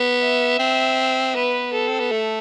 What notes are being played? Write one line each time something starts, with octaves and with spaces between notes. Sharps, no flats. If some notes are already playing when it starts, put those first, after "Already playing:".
Already playing: B3
E5
C4
B3 B4
A4
C4
B3
A3